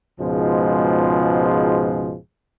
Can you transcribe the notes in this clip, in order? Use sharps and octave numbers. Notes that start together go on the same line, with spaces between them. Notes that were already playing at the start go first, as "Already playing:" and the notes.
C#2 G#2 B2 F3 G#3